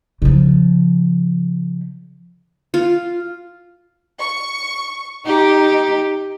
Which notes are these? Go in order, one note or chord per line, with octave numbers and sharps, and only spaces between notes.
C#3 F3
F4
C#6
D#4 G4